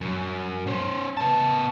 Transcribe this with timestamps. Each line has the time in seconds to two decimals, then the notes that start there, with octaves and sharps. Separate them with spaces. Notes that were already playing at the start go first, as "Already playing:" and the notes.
0.01 F#2
0.67 C#4 C5
1.17 B3 A5